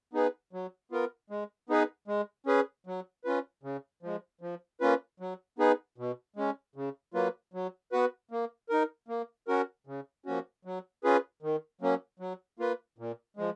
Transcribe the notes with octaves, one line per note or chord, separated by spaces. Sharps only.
B3 D#4 G#4 B4
F#3
B3 F4 A#4
G#3
B3 D#4 G#4 B4
G#3
C#4 G#4 B4
F#3
C#4 F4 B4
C#3
F3 G#3
F3
A#3 C#4 F4 B4
F#3
B3 D#4 G#4 B4
B2
G#3 C#4
C#3
F#3 A#3 F4 B4
F#3
B3 F#4 B4
A#3
D#4 A#4
A#3
C#4 F#4 A#4
C#3
F3 A#3 C#4 F#4
F#3
C#4 F4 G#4 B4
D#3
F#3 A#3 C#4
F#3
A#3 F4 B4
A#2
F3 G#3